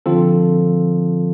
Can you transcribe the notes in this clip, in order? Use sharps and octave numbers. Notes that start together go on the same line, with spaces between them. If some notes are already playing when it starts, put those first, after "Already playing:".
D3 F3 C4 F4 A4